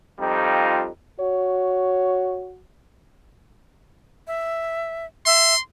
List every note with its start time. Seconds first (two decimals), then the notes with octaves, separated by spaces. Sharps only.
0.19 F2 G3 D#4 F4
1.20 F#4 C#5
4.27 E5
5.26 E5 C6